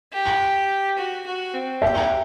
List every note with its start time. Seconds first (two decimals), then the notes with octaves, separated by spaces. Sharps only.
0.13 G4
0.98 F#4
1.26 F#4
1.54 C4
1.82 G4 E5